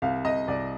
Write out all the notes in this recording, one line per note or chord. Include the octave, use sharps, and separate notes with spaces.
C2 F5
C2 D#5
C2 D5